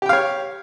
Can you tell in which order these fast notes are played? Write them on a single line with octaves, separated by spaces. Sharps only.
G4 G5 F5 C#5